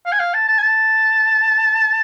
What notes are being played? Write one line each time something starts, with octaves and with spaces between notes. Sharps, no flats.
F5
G#5
F5
A5
A5
G#5
A5